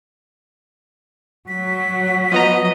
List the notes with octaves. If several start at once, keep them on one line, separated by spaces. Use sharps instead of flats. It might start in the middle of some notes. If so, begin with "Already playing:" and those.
F#3 B6
F3 B3 D#5 A#5